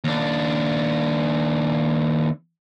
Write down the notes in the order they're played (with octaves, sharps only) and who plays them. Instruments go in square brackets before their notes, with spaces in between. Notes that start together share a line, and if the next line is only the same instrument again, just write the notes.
[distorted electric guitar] D#2 D4